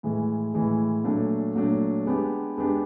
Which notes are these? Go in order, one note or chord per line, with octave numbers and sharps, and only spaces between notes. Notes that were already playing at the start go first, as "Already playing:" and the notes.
A2 E3 G#3
A2 E3 G#3
A#2 F#3 A3 D4
A#2 F#3 A3 D4
G#3 B3 D4 G4
G#3 B3 D4 G4